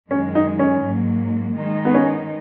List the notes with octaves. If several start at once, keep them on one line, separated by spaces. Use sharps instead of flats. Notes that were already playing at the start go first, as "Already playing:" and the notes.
F#2 D#3 G#3 C#4
D#4
C#4
G#2 F#3 A#3
D#3 G#3 D#4
B3
C#4